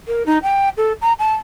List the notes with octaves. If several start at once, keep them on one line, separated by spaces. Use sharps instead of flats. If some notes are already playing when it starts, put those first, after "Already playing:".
A#4
D#4
G5
A4
A#5
A5